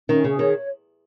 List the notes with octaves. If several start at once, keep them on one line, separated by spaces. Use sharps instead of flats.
D#3 C#4
C#3 G#4
D#3 C#5